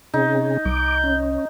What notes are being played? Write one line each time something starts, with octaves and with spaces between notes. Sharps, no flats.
C3 C#4 D#4 G#4
C2 D6 G6
C#4